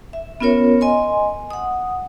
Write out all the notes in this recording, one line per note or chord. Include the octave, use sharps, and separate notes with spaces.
E5
B3 C#4 F4 A#4 C#5
D#5 G#5 C6
F#5 D#6